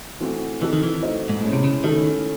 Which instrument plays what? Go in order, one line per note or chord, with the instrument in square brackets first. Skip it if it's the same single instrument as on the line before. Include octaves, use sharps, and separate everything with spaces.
[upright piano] E3 A3 C4 F#4
[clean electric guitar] E3 [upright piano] C4 D#4 A4
[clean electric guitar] D#3
E3
[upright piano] A3 D#4 F#4 C5 D#5
[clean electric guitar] G#2
[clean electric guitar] A2 [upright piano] G#3 C#4 E4
[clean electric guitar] C3
C#3
[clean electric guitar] D#3 [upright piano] A3 C#4 E4 A4